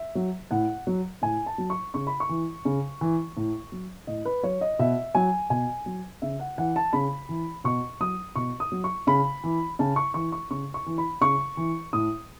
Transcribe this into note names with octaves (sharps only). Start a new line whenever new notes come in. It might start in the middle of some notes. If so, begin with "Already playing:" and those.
Already playing: E5
F#3
A2 F#5
F#3
A2 G#5
A5
F#3
C#6
C#3 C#6
B5
C#6
E3
C#3
E3
A2
F#3
A2 D#5
B4
F#3 C#5
D#5
B2 E5
F#3 G#5
B2 G#5
F#3
C#3 E5
F#5
E3 F#5
A5
C#3 B5
E3
B2 C#6
F#3 D#6
B2 C#6
D#6
F#3
C#6
C#3 B5
E3
C#3 A5
C#6
E3 C#6
C#6
C#3 C#6
C#6
E3
B5
C#3 C#6
E3
A2 D#6